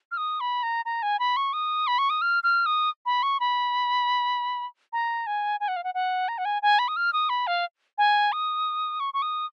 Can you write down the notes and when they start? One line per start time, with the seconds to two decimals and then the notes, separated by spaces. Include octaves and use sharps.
0.11 F6
0.17 D#6
0.40 B5
0.63 A#5
0.85 A#5
1.02 G#5
1.19 B5
1.36 C#6
1.53 D#6
1.87 B5
1.98 C#6
2.10 D#6
2.21 F6
2.43 F6
2.66 D#6
3.06 B5
3.23 C#6
3.40 B5
4.93 A#5
5.27 G#5
5.60 G#5
5.68 F#5
5.76 F5
5.84 F#5
5.94 F#5
6.28 A#5
6.38 F#5
6.45 G#5
6.62 G#5
6.79 B5
6.88 D#6
6.96 F6
7.13 D#6
7.29 B5
7.47 F5
7.98 G#5
8.32 D#6
9.00 C#6
9.14 C#6
9.22 D#6